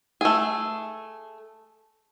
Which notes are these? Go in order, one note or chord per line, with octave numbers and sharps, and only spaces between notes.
A3 G#4